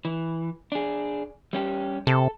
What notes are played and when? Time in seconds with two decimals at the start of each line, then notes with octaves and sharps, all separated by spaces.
0.05 E3
0.72 D4 G#4
1.53 G3 C#4 G4
2.07 C3 A4